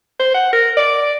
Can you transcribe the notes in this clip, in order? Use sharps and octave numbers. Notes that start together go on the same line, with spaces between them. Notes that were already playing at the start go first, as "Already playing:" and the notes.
C5
F#5
A#4
D5